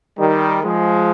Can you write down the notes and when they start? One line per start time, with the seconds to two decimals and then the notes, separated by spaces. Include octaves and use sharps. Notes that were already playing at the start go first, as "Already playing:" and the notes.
0.18 D#3 G3
0.63 F3 G#3